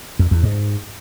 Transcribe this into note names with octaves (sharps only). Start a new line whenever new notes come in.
F2
E2
G#2